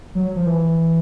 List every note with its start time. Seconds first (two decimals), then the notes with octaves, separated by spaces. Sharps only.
0.15 F#3
0.36 F3
0.46 E3